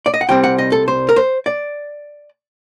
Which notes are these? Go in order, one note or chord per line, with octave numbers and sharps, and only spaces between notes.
D5
D#5
F#5
C2 C3 G3 C4 G5
F#5
D#5
A4
C5
A#4
C5
D5